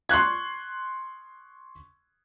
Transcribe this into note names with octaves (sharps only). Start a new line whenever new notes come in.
C6 C#6 F#6 G#6